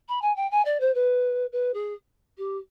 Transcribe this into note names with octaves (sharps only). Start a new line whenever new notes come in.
B5
G#5
G5
G#5
D5
C5
B4
B4
G#4
G4